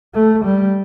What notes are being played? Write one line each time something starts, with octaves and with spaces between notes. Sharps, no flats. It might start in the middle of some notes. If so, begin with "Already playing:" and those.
A3
G3